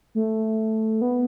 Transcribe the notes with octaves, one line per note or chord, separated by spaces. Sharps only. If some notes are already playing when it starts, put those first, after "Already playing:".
A3
B3